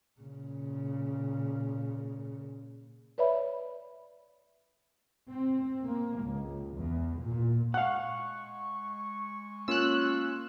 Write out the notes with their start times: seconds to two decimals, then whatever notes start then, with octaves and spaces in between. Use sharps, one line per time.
0.20 A#2 C#3
3.18 B4 C#5 D5 E5 B5
5.28 C4
5.84 A#3
6.20 C#2
6.76 E2
7.20 A#2
7.74 G#3 F5 F#5 C#6 F#6
9.68 A#3 C#4 F4 E6 F#6